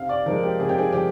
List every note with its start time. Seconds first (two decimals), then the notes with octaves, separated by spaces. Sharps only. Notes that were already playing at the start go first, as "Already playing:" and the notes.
Already playing: C3 F5
0.09 D5
0.26 F3 G#3 A#4
0.43 G4
0.59 C3 G#4
0.69 G4
0.78 G#4
0.93 F3 G4